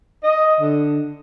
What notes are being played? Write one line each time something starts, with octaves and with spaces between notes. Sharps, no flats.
D#5
D3